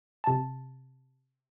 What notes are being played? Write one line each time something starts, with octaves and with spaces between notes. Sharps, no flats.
C3 A5